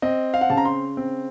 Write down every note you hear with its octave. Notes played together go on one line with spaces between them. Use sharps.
C4 D#5
F5
F#5
C#3 A5
A#5
C6
C4